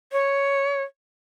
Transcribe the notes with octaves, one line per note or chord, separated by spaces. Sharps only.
C#5